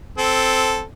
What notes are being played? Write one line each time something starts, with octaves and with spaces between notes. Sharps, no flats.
C4 A4